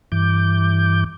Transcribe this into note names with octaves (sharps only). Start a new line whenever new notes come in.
G2 E3 D6 G6